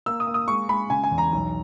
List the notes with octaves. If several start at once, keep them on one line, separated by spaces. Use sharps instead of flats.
A#3 E6
D#6
A#3
D#6
G#3 C#6
G#3 B5
C#3 G#5
G#5
E2
A#5
B1